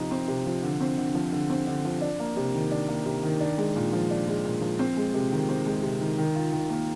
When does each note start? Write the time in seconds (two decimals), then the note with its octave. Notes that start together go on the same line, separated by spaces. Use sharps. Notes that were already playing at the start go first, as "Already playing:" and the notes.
Already playing: C3 F3 C4 D#4
0.11 C4
0.28 C3
0.46 F3
0.63 D3
0.80 C4
0.98 D3
1.15 F3
1.32 D3
1.50 C4
1.67 D3
1.85 F3
2.01 D4
2.20 A#3
2.37 C3
2.55 D#3
2.71 D4
2.88 A#3
3.06 C3
3.23 D#3
3.40 D4
3.58 G#3
3.76 A#2
3.93 F3
4.10 D4
4.27 G#3
4.45 A#2
4.61 F3
4.79 C4
4.97 G#3
5.14 C3
5.32 D#3
5.49 C4
5.66 G#3
5.83 C3
6.01 D#3
6.18 D#3
6.35 F4
6.52 D#3
6.70 A#3